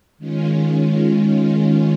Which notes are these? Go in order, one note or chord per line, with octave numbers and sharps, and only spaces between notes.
D#3 G#3 C#4 F4